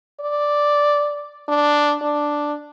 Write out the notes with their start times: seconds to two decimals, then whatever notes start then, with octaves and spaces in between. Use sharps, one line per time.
0.21 D5
1.48 D4
2.02 D4